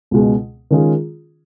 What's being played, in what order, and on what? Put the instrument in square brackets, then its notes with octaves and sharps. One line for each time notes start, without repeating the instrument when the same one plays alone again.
[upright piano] C#2 B2 G#3
D#3 G#3 C#4 F4 G#4